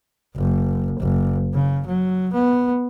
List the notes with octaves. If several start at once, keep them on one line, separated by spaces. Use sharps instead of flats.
F#1
F#1
C#3
F#3
B3